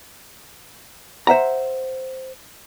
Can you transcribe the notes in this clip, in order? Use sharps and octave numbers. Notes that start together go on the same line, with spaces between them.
C5 E5 F#5 A#5